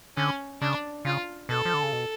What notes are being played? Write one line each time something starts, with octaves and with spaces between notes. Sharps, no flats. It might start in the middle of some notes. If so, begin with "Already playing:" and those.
D3 C#4
C#3 D4
C#3 F4
B2 A4
F3
D3
C#3
B2